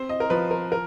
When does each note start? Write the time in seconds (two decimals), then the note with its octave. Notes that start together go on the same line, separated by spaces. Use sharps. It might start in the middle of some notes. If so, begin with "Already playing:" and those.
Already playing: C4 C5
0.09 D#5
0.20 A#4
0.30 F3 B4
0.51 A#4
0.72 A#4